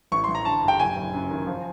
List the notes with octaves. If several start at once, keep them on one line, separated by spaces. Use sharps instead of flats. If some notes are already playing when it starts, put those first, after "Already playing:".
A1 C#6
C6
A1
A#5
D3 A5
G2
G5
F#1 G#5
F#1
F#2
D#3
F3